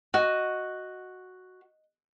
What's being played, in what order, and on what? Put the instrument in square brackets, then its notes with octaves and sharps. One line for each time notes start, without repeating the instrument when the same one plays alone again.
[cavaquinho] F#4 [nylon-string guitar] D#5